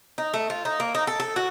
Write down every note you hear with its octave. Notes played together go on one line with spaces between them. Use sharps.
D#4
A3
F4
D#4
A#3
D#4
A4
A4
F#4